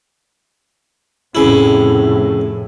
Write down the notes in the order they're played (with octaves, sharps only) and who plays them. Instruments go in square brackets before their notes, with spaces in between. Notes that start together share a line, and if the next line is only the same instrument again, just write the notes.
[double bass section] F1 A2 [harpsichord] C#3 E4